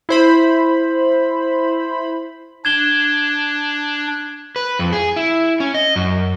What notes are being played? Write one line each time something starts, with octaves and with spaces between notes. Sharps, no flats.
E4 C5 B5
D4 G#6 E7 G7
B4
F2
G#4
E4
C#4
D#5
F#2